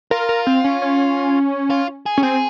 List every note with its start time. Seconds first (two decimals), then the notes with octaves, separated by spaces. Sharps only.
0.11 F4 A#4
0.29 A#4
0.47 C4
0.64 C#4
0.82 C#4
1.70 F4
2.06 G#4
2.18 C#4
2.23 C4 G#4